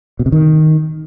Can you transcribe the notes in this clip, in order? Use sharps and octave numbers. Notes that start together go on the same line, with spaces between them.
B2
C3
D#3